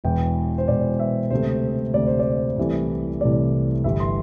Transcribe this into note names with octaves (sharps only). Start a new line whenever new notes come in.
E1 E2 E3 G5
C5
E1 E2 E3 D5
E5
D2 C3 A3 C5
D2 C3 A3 D5
C5
D5
C2 C3 E3 A3
C2 C3 E3 A3 D5
G1 G2 E3 G3 E5
C6